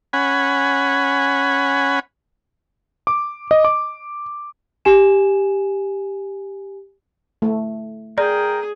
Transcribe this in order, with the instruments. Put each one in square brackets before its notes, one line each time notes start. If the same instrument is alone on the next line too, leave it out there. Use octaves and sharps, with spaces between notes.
[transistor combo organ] C#4 F#5 G#5 B5
[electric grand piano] D6
D#5
D6
[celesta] G4 G#5 E7
[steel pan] A3
[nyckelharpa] G#4 [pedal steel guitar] A#4 G5 [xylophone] D5